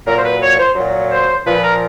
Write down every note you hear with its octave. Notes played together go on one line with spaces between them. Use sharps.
A#2 F#3 A#4
C5
B4
C#5
C5
A#2 F#3
C5
A#2 F3 B4
A#4